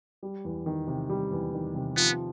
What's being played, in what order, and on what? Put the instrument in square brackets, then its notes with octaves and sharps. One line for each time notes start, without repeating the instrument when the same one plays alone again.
[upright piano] G3
E2
D#3
C3
G3
E2
D#3
C3
[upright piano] F3 [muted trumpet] B3